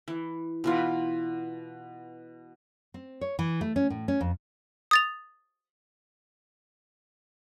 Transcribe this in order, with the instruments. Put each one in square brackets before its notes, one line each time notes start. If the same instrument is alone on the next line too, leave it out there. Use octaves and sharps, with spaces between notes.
[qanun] E3
B2 E3 F4
[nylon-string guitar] C4
C#5
E3
A3
C#4
A2
C#4
F2
[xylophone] D#6 A6 F7